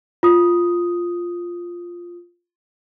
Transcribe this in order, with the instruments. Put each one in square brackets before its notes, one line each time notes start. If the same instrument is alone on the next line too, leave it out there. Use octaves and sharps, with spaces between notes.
[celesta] F4 D#6